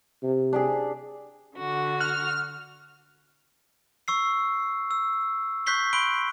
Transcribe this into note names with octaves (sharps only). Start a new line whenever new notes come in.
C3
D4 G4 G#4
D3 F#4
F6 F#6
C#6 E6 C7
E6
C#6 F#6 G6 B6 C7 G7
B5 C6 F#6 D7 G7